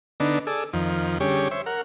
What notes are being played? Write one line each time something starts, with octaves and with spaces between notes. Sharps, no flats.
D3 B3 D4 D#4
G#4 A4 D5 E6
F2 D#3 F3
D3 G3 C#4 G4 G#4 C#5
C5 C#5 E5
A#4 F#5